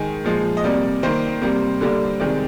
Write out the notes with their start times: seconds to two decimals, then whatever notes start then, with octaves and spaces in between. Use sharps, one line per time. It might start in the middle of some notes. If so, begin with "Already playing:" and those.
Already playing: D#3 G#3 G#5
0.25 A#2 F3 G#3
0.57 D#5
0.64 C3 G3 A#3 D5
1.03 D#3 A#3 C5
1.42 C3 G3 A#3
1.81 D3 G3 A#3
2.20 C3 D#3 G#3 D5